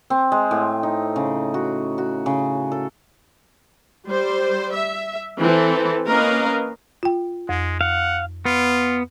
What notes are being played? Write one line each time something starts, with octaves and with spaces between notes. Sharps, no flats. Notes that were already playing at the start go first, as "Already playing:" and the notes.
C4
G#3
A2
D#4
C#3
F#4
F#4
C#3
A4
G3 C5
E5
E3 C4 A4
A#3 C#4 A#4 B4 D#5 F5
F4 G5
F2 G#3
F5 F#5
B3 F4